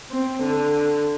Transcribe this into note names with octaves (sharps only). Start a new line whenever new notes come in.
C4
D3